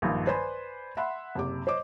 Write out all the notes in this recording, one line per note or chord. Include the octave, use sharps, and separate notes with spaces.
A#1 G2 D#3 F3
B4 C5 D5 G#5 B5 C6
E5 F#5 B5 C6
F#1 C3 D6
C5 C#5 D#5 D6